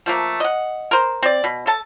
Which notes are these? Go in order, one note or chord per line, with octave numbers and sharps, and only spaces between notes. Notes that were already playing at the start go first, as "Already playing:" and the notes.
F3 A3 A#3
D#5 F#5
A#4 C5
C4 D5
B2
A4 A5